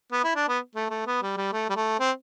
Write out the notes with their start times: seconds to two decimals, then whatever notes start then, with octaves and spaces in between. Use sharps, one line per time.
0.12 B3
0.24 E4
0.35 D4
0.48 B3
0.75 A3
0.90 A3
1.06 B3
1.22 G3
1.37 G3
1.53 A3
1.70 G3
1.76 A3
2.00 C4